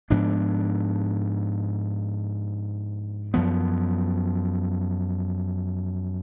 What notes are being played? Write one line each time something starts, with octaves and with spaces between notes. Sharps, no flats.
G#2 F3 B3 D4
F#2 F3 B3